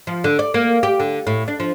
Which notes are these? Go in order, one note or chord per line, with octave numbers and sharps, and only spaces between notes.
F3
D3
D5
A#3
G4
D3
A2
D4
F3